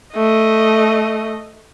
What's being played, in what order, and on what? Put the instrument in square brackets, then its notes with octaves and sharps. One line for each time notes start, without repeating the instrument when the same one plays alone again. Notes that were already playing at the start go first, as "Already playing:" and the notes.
[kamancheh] A3 D#5